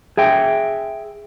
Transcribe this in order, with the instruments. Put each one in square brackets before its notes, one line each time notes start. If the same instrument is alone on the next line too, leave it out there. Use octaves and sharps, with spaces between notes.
[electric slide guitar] G#4 E5 G5